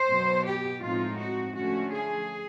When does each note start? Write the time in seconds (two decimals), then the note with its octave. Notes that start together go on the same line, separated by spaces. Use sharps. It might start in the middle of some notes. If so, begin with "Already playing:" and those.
Already playing: C5
0.08 B2 F#3 B3
0.45 G4
0.81 A2 F3 G#3 C4 D#4 F4
1.17 F#4
1.54 D3 F3 A3 C#4 F#4
1.91 G#4